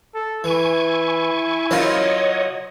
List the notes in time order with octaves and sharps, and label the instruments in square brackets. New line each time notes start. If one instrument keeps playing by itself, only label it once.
[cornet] A4
[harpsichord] E3 [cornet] E4 [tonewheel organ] G#5 C#6
[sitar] F#3 F4 [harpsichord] A#4 C5 A5 [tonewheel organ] C#5 D#5